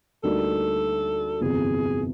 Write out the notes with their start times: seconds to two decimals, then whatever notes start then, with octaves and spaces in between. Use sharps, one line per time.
0.23 D2 D3 G3 A#3 D#4 A4
1.41 G1 F2 C3 E3 G#4